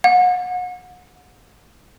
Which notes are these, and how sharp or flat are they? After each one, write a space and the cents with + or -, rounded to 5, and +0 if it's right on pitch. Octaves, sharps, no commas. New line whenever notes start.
F#5 -35